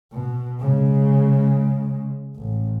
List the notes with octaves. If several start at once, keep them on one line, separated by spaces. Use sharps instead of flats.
B2
C#3 G#3
A1